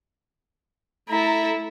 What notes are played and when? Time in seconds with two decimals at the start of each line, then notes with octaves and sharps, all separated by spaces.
1.10 A3 E4 A4 A#5